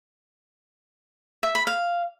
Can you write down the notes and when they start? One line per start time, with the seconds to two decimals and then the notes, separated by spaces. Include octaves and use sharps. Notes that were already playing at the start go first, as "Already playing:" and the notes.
1.43 E5
1.55 B5
1.67 F5